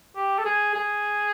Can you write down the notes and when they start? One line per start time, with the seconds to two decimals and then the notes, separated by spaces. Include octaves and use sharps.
0.16 G4
0.38 A4
0.45 G#4
0.75 G#4